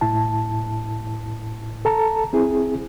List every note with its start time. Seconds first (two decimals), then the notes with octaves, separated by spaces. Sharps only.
0.01 A2 E4 A5
1.85 A4 A5 A#5
2.33 C4 E4 G#4